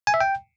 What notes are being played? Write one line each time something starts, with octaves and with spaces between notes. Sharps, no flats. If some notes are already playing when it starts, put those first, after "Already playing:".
G#5
E5
G5